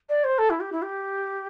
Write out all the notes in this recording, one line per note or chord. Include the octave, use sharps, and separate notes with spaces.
D5
C5
A4
E4
G4
E4
G4